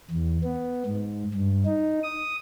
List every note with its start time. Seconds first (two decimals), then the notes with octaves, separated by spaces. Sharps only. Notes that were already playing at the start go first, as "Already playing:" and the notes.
0.11 E2
0.43 B3
0.86 G#2
1.35 G2
1.65 D#4
2.04 D#6